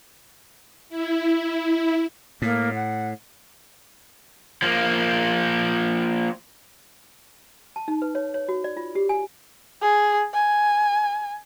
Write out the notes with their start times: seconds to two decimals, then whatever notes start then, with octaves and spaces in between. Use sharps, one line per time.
0.89 E4
2.42 A2 A#3
2.75 F#5
4.62 F3 A#3
7.76 A5
7.88 D#4
8.02 B4
8.15 C#5
8.34 C#5
8.49 F#4
8.64 D5
8.77 F4
8.95 G4
9.09 G#5
9.82 G#4
10.34 G#5